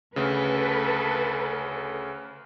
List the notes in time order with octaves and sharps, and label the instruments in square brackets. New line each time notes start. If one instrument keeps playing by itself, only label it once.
[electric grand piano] D2 C#3 [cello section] A4 B4